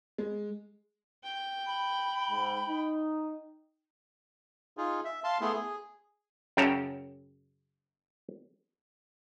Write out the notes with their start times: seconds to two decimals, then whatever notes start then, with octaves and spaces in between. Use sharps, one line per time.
0.18 G#3
1.23 G5
1.67 B5
2.31 G#2
2.68 D#4
4.77 D#4 F4 G#4
5.05 E5
5.24 F5 A5 C6
5.41 A3 B3 E4 G#4 C6
5.54 G#4
6.57 F#2 C#3 C#4 G5 A5 A#5